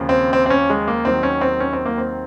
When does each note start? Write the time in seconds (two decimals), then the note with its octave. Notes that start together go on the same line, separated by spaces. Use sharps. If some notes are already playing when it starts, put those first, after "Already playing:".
Already playing: D#2 C#3 F3
0.09 C4
0.33 C4
0.46 C4
0.50 C#4
0.70 G#3
0.88 A#3
1.05 D#2 D#3 F#3 C4
1.23 C#4
1.41 C4
1.60 C#4
1.73 C4
1.85 A#3
1.98 C4